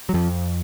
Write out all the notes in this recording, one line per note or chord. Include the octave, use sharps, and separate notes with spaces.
F#3
F2 F3